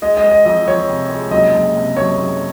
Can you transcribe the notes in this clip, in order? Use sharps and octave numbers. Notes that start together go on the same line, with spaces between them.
G#3 D#5
D#5
G#3
D#5
F2 D#5
F2 C#5
C3
G#3
F#1 D#5
F#1
C3
F#1 C#5
F#1